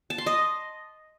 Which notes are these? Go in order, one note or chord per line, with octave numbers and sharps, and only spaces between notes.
A5
C6
D#5